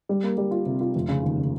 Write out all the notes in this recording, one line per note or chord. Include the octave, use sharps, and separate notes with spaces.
G3
A#3
G3
F4
C3
F4
F1
C#3
D#2
C#3